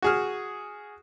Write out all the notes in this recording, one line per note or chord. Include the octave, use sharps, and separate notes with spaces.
F#4 G#4 F6